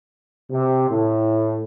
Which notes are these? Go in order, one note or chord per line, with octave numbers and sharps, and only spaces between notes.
C3
A2